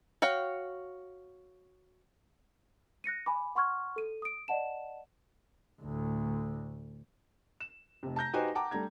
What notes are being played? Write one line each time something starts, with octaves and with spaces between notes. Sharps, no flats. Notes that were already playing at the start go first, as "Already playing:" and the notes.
F#4 C#5 F5 G5
F#6 A#6 C#7 D#7
G#5 B5 D6
F#5 C6 C#6 F6 G#6
A4 D#7
D#6 D7
D5 D#5 F#5 A5 E7
D2 A2
E7
F1 C3
A5 A#5 G6 A#6
D#4 F#4 G4 B4 C5 G#5
F#5 G5 A5 A#5 D6
G3 A3 D4 A#5 G#6